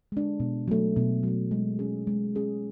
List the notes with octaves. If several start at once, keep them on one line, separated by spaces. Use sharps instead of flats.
G#3 D4
B2
F#3 A3
B2
F#3 A3
G#3
C#4 G#4
G#3
C#4 G#4